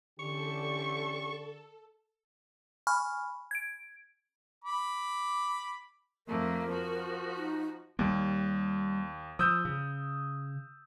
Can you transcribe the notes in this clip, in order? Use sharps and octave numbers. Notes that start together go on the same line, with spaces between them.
D3 E3 C#4 G4 A4 C#6
G#5 B5 C#6 F6
G#6 D7
B5 D6
F2 A3 A#3 A#4
F3 F#4
D#4
D#2 G3 A#3
F3 D#6 E6 G6
C#3